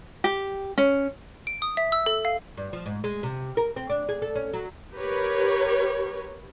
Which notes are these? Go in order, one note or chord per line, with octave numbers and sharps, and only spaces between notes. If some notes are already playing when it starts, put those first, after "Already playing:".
G4
C#4
D7
D#6
E5
E6
A4
F5
G2
F3
G#2
G#3
C3
A#4
C4
D4
G#4
A4
C#4
F#3
G4 A#4 B4 C#5